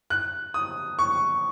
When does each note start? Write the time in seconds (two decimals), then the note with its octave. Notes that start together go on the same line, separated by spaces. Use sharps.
0.10 F#6
0.54 D#6
0.99 C#6